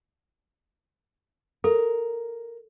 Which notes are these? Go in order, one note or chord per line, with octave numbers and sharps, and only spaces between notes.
A4 A#4